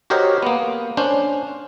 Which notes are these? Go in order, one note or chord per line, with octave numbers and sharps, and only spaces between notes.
F#4 G4 A#4 C5 C#5 D#5
A#3 B3
C#4 D4 C5